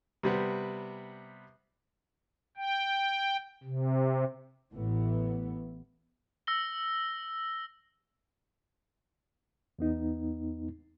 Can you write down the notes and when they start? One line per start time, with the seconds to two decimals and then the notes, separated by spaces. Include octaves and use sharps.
0.23 C3 G3 B3
2.57 G5
3.64 C3
4.73 A1 A2 E3 B3
6.47 E6 A#6 G7
9.79 E2 B3 D#4